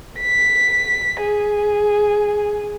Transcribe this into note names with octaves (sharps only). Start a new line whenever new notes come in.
B6
G#4